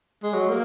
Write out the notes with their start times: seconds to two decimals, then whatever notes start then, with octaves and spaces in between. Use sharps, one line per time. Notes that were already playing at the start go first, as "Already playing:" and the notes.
0.23 G#3
0.33 F#3
0.49 A#3